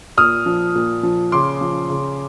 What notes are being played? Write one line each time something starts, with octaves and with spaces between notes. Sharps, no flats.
A#2 D#6 F6
F3
A#2
F3
C#3 C6 D6
F3
C#3